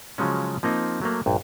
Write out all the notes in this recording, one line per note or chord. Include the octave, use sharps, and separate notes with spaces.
C#3 F3 F#3 G#3 C#4
F3 A#3 C4 D#4
F#3 A3 A#3
A#1 G2